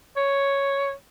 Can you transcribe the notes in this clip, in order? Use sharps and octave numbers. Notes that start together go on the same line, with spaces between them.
C#5